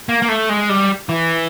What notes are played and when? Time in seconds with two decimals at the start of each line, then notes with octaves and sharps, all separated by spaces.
0.09 A#3
0.22 A#3
0.29 A3
0.49 G#3
0.69 G3
1.09 E3